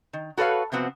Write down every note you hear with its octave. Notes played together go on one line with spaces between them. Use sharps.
D#3
F#4 A4 B4 C#5 F5
C3 F3 B3 C4 F#4